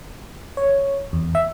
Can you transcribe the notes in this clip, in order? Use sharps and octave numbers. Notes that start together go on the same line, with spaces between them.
C#5
E2
E5